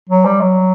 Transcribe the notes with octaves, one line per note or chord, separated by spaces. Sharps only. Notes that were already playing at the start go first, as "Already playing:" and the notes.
F#3
G3
F#3